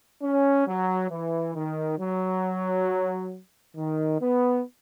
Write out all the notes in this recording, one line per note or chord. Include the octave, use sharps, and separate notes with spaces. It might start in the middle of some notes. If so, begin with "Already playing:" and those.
C#4
F#3
E3
D#3
F#3
D#3
B3